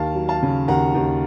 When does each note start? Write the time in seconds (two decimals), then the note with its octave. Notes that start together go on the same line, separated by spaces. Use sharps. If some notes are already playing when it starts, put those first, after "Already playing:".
Already playing: D#2 F5 A5
0.15 F#3
0.28 F5 A5
0.43 C#3
0.68 D#2 F#5 A#5
0.95 D#2